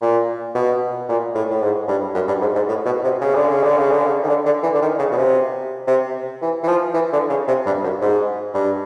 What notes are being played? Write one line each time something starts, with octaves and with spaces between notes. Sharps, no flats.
A#2
B2
A#2
A2
A2
G#2
G2
F#2
G2
G#2
G#2
A2
B2
C3
C#3
D3
C#3
D3
C#3
D3
C#3
D#3
D3
D3
E3
D3
D#3
C#3
B2
C3
C3
E3
E3
F3
E3
D3
C#3
C3
G2
F#2
G#2
G2